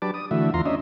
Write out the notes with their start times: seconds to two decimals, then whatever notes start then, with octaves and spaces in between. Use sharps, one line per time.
0.02 F#3 D4 G4 B4 A5 D6
0.14 D#6
0.31 D3 E3 A3 F#4 E5
0.54 E2 F4 A#5 C6
0.66 C#4 D4 D#5 E5